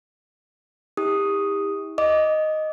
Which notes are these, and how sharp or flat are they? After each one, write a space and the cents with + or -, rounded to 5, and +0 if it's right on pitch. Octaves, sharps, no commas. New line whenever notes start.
E4 -45 G4 +35 D#6 +0
D#5 +0 D6 -10